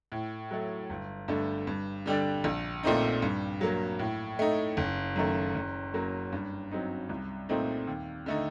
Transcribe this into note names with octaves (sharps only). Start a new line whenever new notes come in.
A2
F#3 A3
G1
G2 D3 A3
G2
D3 G3 D4
A#1
A#2 A3 C4 D#4
G2
F#3 A#3
A2
A3 D#4
F#1
F#2 D#3 A3
F#1
F#2 F#3 A#3
G2
F#3 C4 D#4
C2
A#2 A3 C4 D#4
D#2
D3 A3 D#4